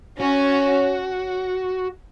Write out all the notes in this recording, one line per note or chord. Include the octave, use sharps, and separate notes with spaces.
C#4 F#4